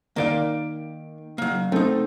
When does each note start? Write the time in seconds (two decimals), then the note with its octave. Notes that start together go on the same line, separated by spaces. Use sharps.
0.16 D#3 A#3 D5 F5 D7
1.38 F#3 A#3
1.72 A3 C4 D#4 A4